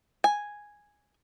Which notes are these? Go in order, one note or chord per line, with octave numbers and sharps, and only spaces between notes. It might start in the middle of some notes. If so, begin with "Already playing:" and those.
G#5